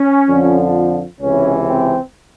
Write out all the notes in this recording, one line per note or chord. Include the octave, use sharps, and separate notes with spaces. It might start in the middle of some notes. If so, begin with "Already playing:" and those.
Already playing: C#4
F2 D3 F3
C#2 C3 E3 C#4
C4